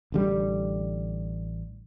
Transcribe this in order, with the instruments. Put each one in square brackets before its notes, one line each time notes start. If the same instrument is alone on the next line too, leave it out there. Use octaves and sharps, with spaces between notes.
[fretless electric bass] A1 D3 G3